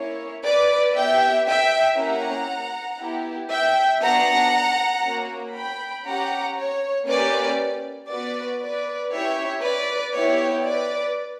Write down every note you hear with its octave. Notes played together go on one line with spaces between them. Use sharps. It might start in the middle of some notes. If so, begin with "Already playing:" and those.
Already playing: A#3 C#4 E4 C#5
B4 D5
B3 E4 G4 E5 G5
E5 G5
A#3 C#4 E4 G4 F#5 A#5
B3 E4 G4
E5 G5
B3 D4 F#4 F#5 A#5
A#3 C#4 F#4
G5 B5
C#4 G4 F#5 A#5
C#5
A#3 C#4 G4 B4 D5
B3 F#4 B4 D5
B4 D5
C#4 E4 G4 C#5 E5
B4 D5
B3 E4 G4 C#5
B4 D5